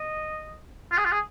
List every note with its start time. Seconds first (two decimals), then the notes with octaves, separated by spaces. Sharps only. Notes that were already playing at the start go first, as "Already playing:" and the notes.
Already playing: D#5
0.91 F4
0.98 G#4
1.05 F4
1.12 G#4